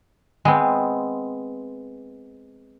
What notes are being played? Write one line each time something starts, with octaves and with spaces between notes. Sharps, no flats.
G#3 B3 C4